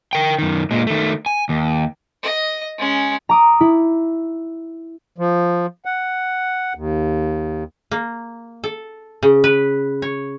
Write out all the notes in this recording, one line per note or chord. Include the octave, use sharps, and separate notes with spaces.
A#4 G5
F#2 D#3
A#2 G#3
D#3 A3
G#5
D#2
D#5
G#3 C#4
A#5 D6 D#6
E4
F3
F#5
D#2
A#3
A4
C#3
B4
C#5